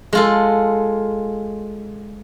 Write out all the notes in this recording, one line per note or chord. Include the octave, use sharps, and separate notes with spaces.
G#3 F4 A4